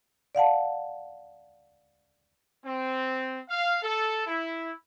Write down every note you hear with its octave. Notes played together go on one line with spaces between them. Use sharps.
D5 F5 F#5 A5
C4
F5
A4
E4